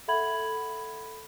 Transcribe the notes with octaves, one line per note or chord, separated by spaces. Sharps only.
A4 E5 F#5 B5 G#6 F#7